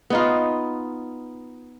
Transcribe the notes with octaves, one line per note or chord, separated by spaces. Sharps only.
B3 D#4 F4